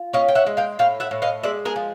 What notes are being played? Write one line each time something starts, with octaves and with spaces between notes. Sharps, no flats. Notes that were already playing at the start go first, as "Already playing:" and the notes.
Already playing: F4
C#4 D#5 F5
G5
E5 F#5
G#3
F5 G5
A2 F5 G5
E5 F#5
A2
D#5 F5
G#3 D5 E5
G#4 A#4
F3